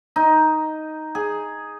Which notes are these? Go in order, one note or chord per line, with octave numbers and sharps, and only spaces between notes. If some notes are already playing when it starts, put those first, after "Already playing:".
D#4
G#4